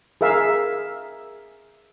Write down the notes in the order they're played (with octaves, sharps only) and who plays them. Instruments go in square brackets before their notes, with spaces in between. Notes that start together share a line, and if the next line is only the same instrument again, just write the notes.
[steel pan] G#4 A#4 E5 F5